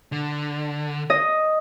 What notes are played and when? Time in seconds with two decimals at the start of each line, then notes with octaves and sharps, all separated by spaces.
0.12 D3
1.10 D#5